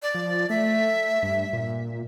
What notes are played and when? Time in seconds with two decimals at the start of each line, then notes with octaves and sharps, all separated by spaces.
0.03 D5
0.14 F3
0.50 A3 E5
1.23 G2
1.53 A#2